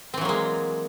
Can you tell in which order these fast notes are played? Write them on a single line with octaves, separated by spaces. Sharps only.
C4 E3 F#3 A#3 G#3